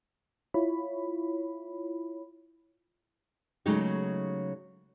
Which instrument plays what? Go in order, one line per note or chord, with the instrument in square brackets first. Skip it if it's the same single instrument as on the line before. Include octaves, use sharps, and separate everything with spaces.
[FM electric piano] E4 F4 C#5 B5
[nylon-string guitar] C#3 F#3 G#3 A3 D#4 G4